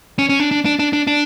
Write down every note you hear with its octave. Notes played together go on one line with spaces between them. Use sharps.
C#4
C#4
D4
D4
D4
D4
D4
D4